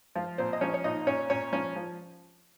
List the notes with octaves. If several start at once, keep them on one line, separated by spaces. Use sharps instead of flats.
F3 F4
A#2 C4 C5
D#5
F3 C#4 C#5
C#5
A#2 D#4 D#5
A#2 C#4 C#5
A#2 C#4 C#5
F3 C#4 C#5
F3